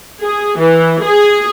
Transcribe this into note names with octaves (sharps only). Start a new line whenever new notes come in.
G#4
E3
G#4